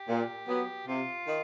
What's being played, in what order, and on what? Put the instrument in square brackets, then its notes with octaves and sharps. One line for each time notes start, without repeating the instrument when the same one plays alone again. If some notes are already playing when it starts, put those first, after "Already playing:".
Already playing: [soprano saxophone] G4
[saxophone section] A#2
F#3 B3
[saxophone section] C3 [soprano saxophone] F4
[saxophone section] D#3